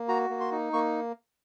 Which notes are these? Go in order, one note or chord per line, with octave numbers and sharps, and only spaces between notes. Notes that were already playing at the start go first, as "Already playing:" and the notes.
Already playing: A#3
F#4 A#5
A#3
C6
D#4
A#3 C#6